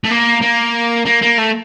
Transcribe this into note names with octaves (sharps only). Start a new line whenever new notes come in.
A3
A#3
A#3
A#3
A#3
A3